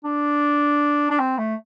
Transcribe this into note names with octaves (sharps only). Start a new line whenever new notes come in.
D4
D4
C4
A3